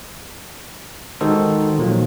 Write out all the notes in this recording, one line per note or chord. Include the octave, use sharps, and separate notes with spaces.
D#3 G#3 D#4 F#4 A4 C5
A#2 D#3 F3 F#3 A#3